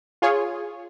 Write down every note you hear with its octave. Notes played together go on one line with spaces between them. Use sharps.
F4 G#4 C#5